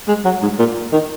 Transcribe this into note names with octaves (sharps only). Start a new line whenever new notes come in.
G#3
F#3
G#2
A#2
D#3